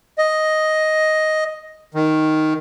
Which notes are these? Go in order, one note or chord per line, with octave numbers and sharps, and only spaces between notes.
D#5
D#3